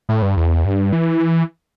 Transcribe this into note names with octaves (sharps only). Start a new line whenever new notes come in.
A2
G2
E2
G2
E3